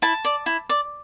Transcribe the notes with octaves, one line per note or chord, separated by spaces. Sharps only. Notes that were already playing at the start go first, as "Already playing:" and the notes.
E4 A5
D5
E4
D5